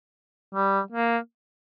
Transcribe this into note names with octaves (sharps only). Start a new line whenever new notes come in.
G3
A#3